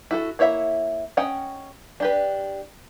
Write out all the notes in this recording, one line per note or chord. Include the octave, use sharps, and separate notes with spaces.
E4 F#4 A4
A#3 E4 C#5 E5 F#5
C#4 D#5 F#5 G5
D4 G4 B4